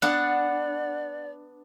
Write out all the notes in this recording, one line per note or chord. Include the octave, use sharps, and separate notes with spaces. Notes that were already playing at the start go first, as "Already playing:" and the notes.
B3 D4 D5 F#5